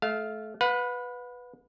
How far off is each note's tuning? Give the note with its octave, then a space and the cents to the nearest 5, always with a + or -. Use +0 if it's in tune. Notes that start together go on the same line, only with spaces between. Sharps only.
A3 -30 F5 +0
B4 +0 F#5 -40